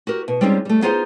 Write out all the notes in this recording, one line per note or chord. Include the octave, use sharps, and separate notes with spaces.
F#4 G4 A#4
B2
G3 G#3 C4 C#4 D#4 F4
G3 A3
B3 D#4 F4 G#4 C5 F#5